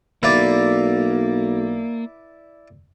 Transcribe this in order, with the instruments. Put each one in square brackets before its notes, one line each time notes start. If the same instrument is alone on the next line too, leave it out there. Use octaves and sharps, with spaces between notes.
[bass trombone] B1 [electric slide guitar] A#3 [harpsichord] E4 B4 D5